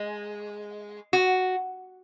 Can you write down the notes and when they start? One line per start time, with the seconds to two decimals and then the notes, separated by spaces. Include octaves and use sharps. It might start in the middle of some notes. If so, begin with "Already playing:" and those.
Already playing: G#3
1.13 F#4